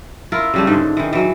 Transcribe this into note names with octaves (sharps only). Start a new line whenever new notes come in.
E4 F4 A#4
C#3 G3 A3
G#2 D3
D#3 E3
E3 F#3